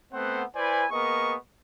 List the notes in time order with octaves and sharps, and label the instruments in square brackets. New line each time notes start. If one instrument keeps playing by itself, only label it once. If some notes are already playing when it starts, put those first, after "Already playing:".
[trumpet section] A3 B3 C4 C5 F#5
E4 B4 C5 D5 G#5
A#3 B3 G#4 A#4 D#5 C#6